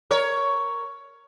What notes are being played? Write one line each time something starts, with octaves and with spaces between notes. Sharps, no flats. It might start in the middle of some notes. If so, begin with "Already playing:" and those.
A#4 C#5